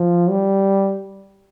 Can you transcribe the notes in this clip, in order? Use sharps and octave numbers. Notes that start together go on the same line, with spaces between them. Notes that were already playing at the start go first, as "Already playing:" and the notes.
Already playing: F3
G3